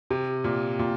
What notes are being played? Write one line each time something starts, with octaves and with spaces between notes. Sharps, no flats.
C3
A#2
A#2